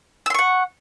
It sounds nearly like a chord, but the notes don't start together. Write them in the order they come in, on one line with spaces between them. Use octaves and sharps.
E6 C6 C#6 F#5